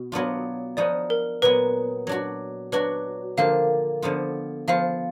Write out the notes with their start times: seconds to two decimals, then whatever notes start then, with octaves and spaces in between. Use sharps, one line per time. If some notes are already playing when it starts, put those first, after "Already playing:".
Already playing: B2
0.12 F#3 B3 D4 F4
0.77 F3 B3 D#4 F#4 D5
1.10 A#4
1.42 A#2 F#3 B3 B4
2.07 F#3 D4 F#4
2.72 F#3 D4 F#4 B4
3.37 D3 F3 A#3 F4 F5
4.02 D3 F3 B3 F4
4.68 F3 B3 F4 F5